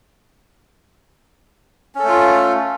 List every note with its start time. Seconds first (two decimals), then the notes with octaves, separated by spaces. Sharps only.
1.95 C#4
1.99 A4
2.04 A3
2.08 F4